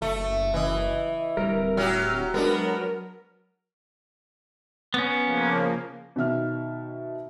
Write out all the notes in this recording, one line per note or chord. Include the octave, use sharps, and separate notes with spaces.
F#1 A3
C#3 E3 D#5
D1 G3 A#4
F#3 G4 F6
F#3 G#3 B3 D4 A#4
B3 C#4
C#3 F3 A#3
B2 D#3 E5 F6